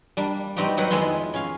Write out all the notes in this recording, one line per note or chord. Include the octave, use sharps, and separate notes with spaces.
G3 A#3 D4
G3 B3 C4 D#4 F#4 G4
F#3 D#4 F#4 A#4 B4
F2 D#3 G#3 B3 E4 C6
C#4 F5